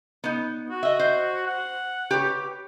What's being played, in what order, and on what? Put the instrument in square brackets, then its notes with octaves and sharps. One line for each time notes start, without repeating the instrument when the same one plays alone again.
[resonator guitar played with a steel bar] B3 D#4
[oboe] F#4
[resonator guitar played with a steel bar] D#5 E5
C5
[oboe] F#5
[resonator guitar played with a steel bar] G4 B4 C#5